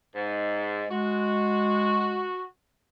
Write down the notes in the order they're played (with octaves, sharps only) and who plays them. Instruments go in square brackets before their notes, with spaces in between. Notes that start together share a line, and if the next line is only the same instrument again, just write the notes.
[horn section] G#2
[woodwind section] G#3 [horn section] F#4